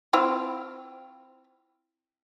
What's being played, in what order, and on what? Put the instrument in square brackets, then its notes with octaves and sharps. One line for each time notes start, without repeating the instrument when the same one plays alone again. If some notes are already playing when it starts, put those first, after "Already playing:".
[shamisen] C4 E4 F4